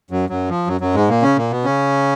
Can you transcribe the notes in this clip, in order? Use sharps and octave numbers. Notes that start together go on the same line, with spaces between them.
F#2 F#3
F#2 F#3
F3
F#2 F#3
F#2 F#3
G#2 G#3
A#2 A#3
C#3 C#4
A#2 A#3
B2 B3
C#3 C#4